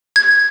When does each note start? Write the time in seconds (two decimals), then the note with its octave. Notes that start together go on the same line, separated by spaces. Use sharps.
0.16 G#6